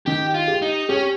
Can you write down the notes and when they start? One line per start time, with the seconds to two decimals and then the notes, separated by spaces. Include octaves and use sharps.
0.06 D#3 G4
0.34 F4
0.48 G4
0.62 D#4
0.89 C#4 G4